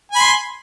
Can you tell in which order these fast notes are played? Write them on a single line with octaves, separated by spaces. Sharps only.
G#5 B5 C6